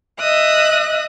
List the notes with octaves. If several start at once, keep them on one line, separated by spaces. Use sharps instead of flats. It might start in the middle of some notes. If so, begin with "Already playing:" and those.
D#5 E5 D#6 F#6